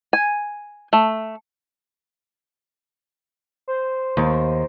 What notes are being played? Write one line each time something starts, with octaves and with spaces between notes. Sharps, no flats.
G#5
A3
C5
D#2